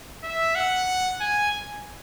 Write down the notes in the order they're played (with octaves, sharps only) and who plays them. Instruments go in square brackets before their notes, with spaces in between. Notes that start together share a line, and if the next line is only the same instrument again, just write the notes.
[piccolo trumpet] E5
F#5
G#5